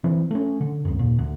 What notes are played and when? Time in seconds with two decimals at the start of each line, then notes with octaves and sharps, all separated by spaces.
0.04 E3 C4
0.31 A3 C#4
0.61 D3
0.85 C#2 F#2
0.99 D#2 A#2
1.19 D2